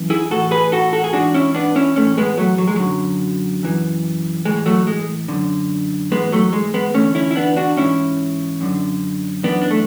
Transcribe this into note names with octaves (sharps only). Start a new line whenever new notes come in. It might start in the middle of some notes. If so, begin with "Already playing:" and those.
Already playing: F#2 E3
E4 G#4
A2 E3 F#4 A4
G#4 B4
F#4 A4
F#4 A4
G#4
G#2 E3 D4 F#4
C#4 E4
B3 D4
C#4 E4
A2 E3 A3 C#4
G#3 B3
F#3 A3
F#3
G#3
F#2 D3 F#3
F#2 E3
A2 E3 G#3
F#3 A3
G#3
F#2 D3
G#2 E3 G#3 B3
F#3 A3
G#3
G#3 B3
E2 D3 A3 C#4
C#4 E4
E4
B3 D4
D4 F#4
G#2 E3 C#4 E4
F#2 D3
F#2 E3 B3 D4
D4
A3